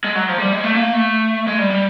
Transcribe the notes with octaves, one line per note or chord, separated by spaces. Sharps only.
G#3
F#3
F3
G3
G#3
A3
A#3
A3
G#3
G3
G3